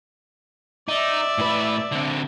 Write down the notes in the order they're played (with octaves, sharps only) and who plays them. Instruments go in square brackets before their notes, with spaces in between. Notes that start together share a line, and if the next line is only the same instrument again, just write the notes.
[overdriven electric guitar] D#4 [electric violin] D5 E5
[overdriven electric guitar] A2 B4
D3 C4